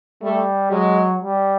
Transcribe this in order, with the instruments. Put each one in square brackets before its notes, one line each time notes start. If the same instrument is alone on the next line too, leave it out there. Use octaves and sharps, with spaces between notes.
[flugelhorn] G3 [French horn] A3
[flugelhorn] F#3 [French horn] G#3
[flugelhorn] G3